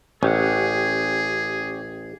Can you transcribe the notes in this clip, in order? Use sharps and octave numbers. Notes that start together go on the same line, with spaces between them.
A1 C#4 G4 G#4 F#5